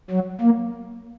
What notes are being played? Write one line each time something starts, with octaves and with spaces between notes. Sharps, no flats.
F#3
A#3